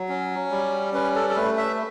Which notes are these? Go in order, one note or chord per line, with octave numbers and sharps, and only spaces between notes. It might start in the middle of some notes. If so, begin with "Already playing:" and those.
Already playing: F#3
C#4
G3
C#4 B4
A4
A4
A3 B4
E5